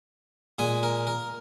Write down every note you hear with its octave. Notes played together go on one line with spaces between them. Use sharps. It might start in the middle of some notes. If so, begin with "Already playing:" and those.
A#2 G#3 G#4
A#4
A#4